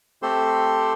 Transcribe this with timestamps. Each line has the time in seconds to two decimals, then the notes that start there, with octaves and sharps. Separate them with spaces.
0.22 A3 C4 G4 A4 C5 C6